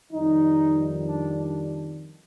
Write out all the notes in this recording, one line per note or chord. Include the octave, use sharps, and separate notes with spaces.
F2 D#3 G3 D#4
D4
D4